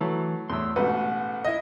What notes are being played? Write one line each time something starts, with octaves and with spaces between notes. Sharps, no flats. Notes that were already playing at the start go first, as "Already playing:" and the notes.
E3 F#3 A3
E2 A2 C6 E6
A1 G#2 B2 B4 F#5
E4 D#5